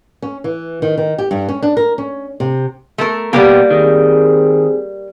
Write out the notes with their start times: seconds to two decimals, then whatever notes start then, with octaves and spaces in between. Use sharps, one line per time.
0.22 C#4
0.44 E3
0.82 D#3
0.98 D#3
1.18 G4
1.31 G2
1.49 C#4
1.63 D4
1.77 A#4
1.98 C#4
2.40 C3
2.98 A3 A#4
3.33 B2 G3 A#3 B3 G4
3.71 D#3 C4 G#4